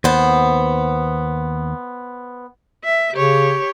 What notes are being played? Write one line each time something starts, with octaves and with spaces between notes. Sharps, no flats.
D#2 B3 C5
E5
C#3 G4 C#5